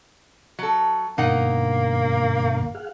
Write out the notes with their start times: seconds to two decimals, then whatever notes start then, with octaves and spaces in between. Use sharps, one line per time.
0.59 F#3 A4
1.18 G2 B2 D3 A#3 D#4 F#5
2.74 G#4 F5 F#5